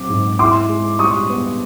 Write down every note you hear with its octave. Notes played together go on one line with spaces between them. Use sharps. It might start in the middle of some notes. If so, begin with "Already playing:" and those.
Already playing: F#3 C4 D6
G#2
E4 C6 D6
G#3
G3 C#6 D#6
B3